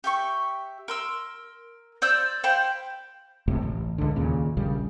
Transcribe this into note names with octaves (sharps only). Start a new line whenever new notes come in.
G4 E5 C#6
A#4 C6 E6
C5 D5 E6 G6
C5 F5 G5 B5
G1 C#2 A2 C3
A1
C#2 D3
D#2 A#2 C#3
A#1 C#3 G3